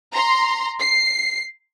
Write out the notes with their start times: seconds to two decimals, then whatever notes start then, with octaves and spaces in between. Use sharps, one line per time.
0.13 A#5 C6
0.79 C7